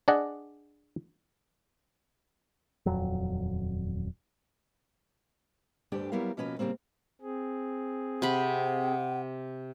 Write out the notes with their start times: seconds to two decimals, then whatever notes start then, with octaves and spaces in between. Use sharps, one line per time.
0.08 D4 G#4 D5 D#5 F#5
2.86 D#1 F2 F#3
5.92 D2 G2 D3 D4 G4 G5
6.12 F#3 G3 B3 E4 A#4 F5
6.37 B2 F3 A#3 C#4 F#4 B4
6.59 C#3 F3 G3 A#3 C4
7.21 C4 G#4
8.22 C3 F#5 B5